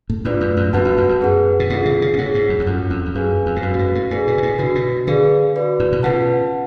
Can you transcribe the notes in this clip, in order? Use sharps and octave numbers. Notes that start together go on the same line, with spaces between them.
A2
G#2 A3 D4 F4 B4 D5
F#2
F#2
F#2 B3 F#4 B4 F#5 A5
F2
F#2
F#2
G#4 B4 F#5
B2
A2 B3 D4 F4 G#4
C#3
C#3
B2
A2 G#4 C#5 F#5
G#2
F#2
F2
F#2 C#4 F4 A4
F2
F2
F#2 G#4 B4 F5 G#5
F2
G#2
F#2 C#4 F#4 B4 F5
A2
G#2
A2
A2 G#4 B4 D5 G#5
B2
B2
A2
C#3 D4 F#4 B4
B2
D3 G#4 B4 D5 F5
F#4 B4 D5
A2
B2
C#3 F4 B4 F#5 A5